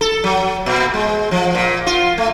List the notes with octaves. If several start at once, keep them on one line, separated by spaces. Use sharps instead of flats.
A4
F#3
A#2
G#3
F3
A#2
F4
A3